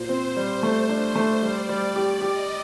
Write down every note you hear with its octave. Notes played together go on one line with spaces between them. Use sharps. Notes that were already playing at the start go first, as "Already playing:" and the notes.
Already playing: A#2 C5
C4
G3
A3
D4
A3
G3 D5
G3
G4
G4 D#5